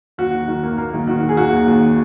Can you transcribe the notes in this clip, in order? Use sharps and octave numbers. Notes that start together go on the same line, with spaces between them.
D#2 F#4
D#3
D#3
A#3
A#3
D#3
D#3 F#4
D#3
G#4
D#2 F#4
D#2
D#2